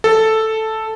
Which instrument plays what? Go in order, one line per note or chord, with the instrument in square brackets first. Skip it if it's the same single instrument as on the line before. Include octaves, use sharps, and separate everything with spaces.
[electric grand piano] A4